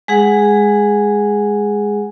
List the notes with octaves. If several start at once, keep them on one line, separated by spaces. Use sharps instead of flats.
G#3 G#4 F#5